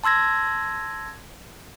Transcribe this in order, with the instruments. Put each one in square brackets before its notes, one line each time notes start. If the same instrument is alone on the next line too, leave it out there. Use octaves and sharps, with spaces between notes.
[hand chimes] A5 C6 E6 G#6 A#6